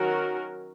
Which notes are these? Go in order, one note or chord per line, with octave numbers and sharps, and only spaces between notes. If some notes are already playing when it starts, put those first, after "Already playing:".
Already playing: D#3 F#3 C#4 F#4 A#4